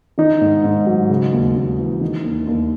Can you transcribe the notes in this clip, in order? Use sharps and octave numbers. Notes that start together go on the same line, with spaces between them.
D#3 D#4
G#2
G#2
F#3
C#3
D#2
D#2
E3
D#3
D#2
D#2